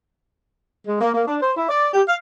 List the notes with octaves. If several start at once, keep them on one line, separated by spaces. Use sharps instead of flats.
G#3
A#3
A#3
D4
C5
E4
D5
G4
F5